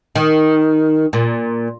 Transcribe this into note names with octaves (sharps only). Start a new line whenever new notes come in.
D#3
A#2